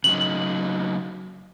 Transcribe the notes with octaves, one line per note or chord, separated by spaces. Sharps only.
C#3 F#3 D#4 F#7